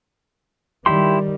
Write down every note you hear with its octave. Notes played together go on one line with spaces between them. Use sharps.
D#3 G3 E4 G4 C6